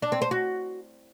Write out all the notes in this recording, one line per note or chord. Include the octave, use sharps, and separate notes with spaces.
D4
C4
C5
F#4